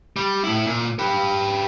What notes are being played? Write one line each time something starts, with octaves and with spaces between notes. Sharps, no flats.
G3
A2 E4
A#2
G4 B4